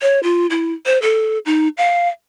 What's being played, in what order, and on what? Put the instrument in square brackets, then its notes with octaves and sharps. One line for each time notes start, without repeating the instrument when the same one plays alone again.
[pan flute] C#5
F4
E4
C5
A4
D#4
F5